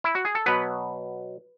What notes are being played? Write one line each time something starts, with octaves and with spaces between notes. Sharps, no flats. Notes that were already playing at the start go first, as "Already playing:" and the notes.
E4
F#4
G#4
A4
B2 F#3 B3 B4